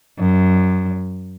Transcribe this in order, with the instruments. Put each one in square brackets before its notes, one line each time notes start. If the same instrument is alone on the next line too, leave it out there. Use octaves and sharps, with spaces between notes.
[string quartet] F#2